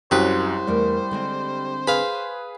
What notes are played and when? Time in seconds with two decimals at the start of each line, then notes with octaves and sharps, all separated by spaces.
0.11 C2 F#2 F#3 B4 C5 G5
0.67 E2 G3 A3 A#4
1.11 D3 G#3 C4
1.87 G#4 B4 F5 B5